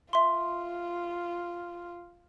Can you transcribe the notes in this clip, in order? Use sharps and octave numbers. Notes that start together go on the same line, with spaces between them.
F4 E5 C6